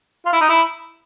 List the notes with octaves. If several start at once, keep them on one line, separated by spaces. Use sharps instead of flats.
F4
E4
D#4
E4